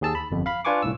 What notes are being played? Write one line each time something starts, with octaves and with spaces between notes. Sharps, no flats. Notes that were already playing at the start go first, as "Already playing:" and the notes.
D#2 G#4 A5 E6
B5
G1 F2
F5 B5
D4 F4 B4 G#5 C#6 D6
C2 A2 E6